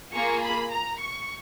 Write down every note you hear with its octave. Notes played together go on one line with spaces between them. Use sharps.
A#3 F4 G#4 C#6
B5
A#5
C#6